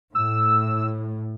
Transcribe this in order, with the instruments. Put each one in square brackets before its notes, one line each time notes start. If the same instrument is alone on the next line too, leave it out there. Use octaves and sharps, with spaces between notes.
[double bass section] A2 [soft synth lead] E6